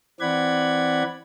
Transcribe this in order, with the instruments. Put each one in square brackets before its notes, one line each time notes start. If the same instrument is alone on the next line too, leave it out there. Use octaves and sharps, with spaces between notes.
[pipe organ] E3 C4 D5 F#5 B5 G#6